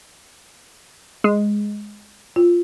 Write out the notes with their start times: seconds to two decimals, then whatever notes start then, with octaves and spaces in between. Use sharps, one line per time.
1.24 G#3
2.36 F4